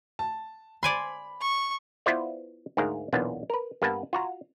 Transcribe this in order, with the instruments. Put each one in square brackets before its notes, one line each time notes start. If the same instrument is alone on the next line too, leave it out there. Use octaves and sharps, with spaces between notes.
[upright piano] A5
[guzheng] D5 G#5 C6 [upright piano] B5
[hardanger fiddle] C#6
[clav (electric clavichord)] B3 E4 F4 B4 C5 D5
D2 G#2 G#4 A#4 F5
B1 E2 A#2 B3 D4 F5
A#4 B4
G2 A#3 B3 B4 F#5 A5
F4 F#4 A#5